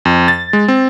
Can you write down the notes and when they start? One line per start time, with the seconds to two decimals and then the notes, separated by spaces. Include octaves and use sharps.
0.05 F2
0.28 A6
0.53 G#3
0.68 C4